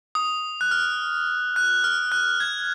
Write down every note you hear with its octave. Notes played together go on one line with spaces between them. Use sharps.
D#6
F#6
F6
F#6
F6
F#6
G#6